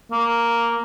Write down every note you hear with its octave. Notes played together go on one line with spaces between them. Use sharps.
A#3